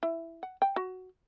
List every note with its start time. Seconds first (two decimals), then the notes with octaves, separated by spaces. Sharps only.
0.03 E4
0.43 F#5
0.62 G5
0.76 F#4